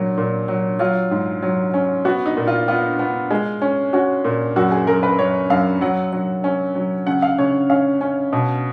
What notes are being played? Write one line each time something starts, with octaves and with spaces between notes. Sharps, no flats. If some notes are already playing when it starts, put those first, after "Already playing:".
Already playing: A#2 F#3
A#2
F#3
F#3 F4
G#2
F#3
C#4
B3 F#4
D#4
A#2
F4
B3 F4
B3
G#3
C#4
C#4 F#4
A#2
F#2 F#4
G#4
F#2 A#4
B4
F#2 C#5
F#2 F5
F#3 F#5
F#3
C#4
F#3
C#3 F#5
F5
C#3 C#5
C#4 F5
C#4
B2